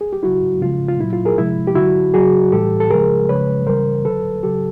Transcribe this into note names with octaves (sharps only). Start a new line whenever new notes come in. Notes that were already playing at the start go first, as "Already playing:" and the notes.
G#4
G4
C#3 F#3 E4 F#4
C#3 F3 G#3 F4
F4
A#2 F#3 E4
F4
G#4 A#4
C3 F3 G#3 E4
G4
D3 F#3 E4 F#4
C#3 F#3 F#4 G#4
A2 E3 G3 G4 A4
A4
C#3 F3 G#3 G#4 A#4
C#3 F3 G#3 B4 C#5
C#3 E3 G3 A#4 C5
D3 F#3 A4 B4
C#3 F#3 G4 A4